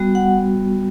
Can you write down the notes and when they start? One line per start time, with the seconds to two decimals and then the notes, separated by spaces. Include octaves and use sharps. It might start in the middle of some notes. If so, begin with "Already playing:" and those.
Already playing: G3 B3 F#4
0.15 F#5